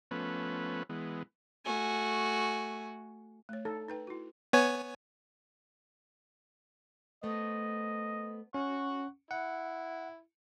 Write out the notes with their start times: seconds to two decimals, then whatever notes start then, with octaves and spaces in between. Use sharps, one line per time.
0.11 F3 A3 B3 C#4 B4
0.90 E3 G#3 B3
1.66 A3 F#4 G#5
3.49 A3 C#5
3.65 D#4 A4
3.89 D#4 B4 G5
4.07 E4 F#4
4.53 B3 C#5 G#5
7.23 A3 B3 C5 D#5
8.54 C#4 F#5 C#6
9.31 E4 F#5